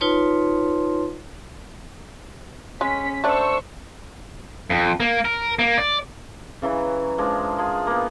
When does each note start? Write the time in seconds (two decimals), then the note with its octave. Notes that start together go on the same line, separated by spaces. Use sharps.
0.01 D#4 F4 B4 C#5 A5 C6
2.81 G#3 C#4 B6
3.24 A3 D4 C5 C#6 E6
4.70 F2
5.00 A#3
5.25 A#4
5.59 A#3
5.78 D5
6.62 C#3 E3 F#3
7.18 F3 G#3 D4 A#4
7.58 F3 G#4
7.87 A#3 B3